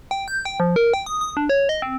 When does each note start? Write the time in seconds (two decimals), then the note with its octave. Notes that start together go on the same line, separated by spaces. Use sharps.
0.11 G5
0.28 G6
0.45 G5
0.60 F3
0.76 A#4
0.94 G5
1.06 D#6
1.21 D#6
1.37 D4
1.49 C#5
1.69 D#5
1.82 C4